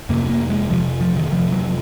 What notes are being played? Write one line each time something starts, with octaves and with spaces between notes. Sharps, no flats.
F2 C3 A#3
A#3
G#3
F2 C3 F3
F3
D#3
F2 C3 F3
F#3